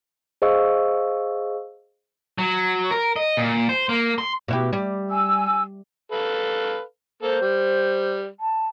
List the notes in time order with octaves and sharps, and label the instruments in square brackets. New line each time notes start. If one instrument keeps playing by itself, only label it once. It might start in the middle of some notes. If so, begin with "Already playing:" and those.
[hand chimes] G#4 C5 D#5 F5 C#6 E6
[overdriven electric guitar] F#3
A#4
D#5
A#2
C5
A#3
C6
[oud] B2 E4 G4
G3
[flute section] G#5 E6
[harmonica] A4 B4 F5
[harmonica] A#3 A4 [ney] C5
[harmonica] G3
[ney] A5